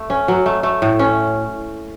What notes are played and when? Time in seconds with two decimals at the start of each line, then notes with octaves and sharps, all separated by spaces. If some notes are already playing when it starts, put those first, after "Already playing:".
Already playing: A3
0.10 C#4
0.28 F#3
0.46 A3
0.63 A3
0.82 A2
0.99 C#4